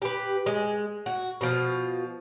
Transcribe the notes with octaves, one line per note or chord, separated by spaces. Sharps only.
G4 B4
G#3
F#4
B2 F3